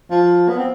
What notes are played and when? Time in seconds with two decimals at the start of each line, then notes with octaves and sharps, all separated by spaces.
0.11 F3
0.49 B3
0.58 C4